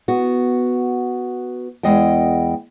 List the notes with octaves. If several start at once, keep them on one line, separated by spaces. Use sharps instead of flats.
B3 F#4
E2 G#3 D#5 F#5 G5